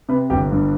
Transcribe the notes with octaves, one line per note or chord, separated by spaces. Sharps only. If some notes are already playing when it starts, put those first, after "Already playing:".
C3 B4
G1 G4
G2